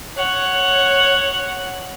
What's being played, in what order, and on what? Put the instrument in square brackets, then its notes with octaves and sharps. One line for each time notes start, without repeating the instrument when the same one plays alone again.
[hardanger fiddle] C#5 F#5